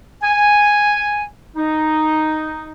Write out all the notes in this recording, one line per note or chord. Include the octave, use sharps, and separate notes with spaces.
G#5
D#4